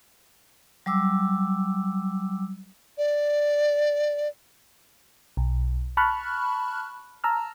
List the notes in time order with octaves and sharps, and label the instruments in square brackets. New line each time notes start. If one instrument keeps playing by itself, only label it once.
[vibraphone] F#3 G3 D6 E6
[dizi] D5
[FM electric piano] B1
A5 B5 C#6 F6 F#6
A5 A#5 E6 F6